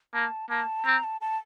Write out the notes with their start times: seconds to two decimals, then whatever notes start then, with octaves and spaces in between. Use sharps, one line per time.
0.14 A#3 A5
0.50 A#3 A5
0.85 C4 A#5
1.04 A5
1.21 A5